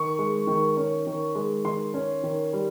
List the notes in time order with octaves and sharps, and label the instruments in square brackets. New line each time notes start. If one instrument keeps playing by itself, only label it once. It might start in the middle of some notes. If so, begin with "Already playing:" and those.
Already playing: [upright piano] D#3 C#6
G#3
D#3
C#4
D#3
G#3
D#3 C6
C#4
D#3
G3